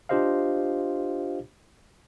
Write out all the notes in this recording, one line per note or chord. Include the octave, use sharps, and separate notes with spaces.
D4 F4 G4 C5 D#5 F5